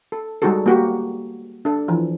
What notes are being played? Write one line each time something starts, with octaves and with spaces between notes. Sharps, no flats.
A4
G3 G#3 D#4 F#4 G#4 A4
A#3 F#4 G4
D4 A4
E3 F3